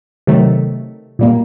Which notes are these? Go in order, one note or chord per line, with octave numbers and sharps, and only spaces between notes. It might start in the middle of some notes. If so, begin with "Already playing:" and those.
C3 D#3 F#3 A3
A#2 G3 A#3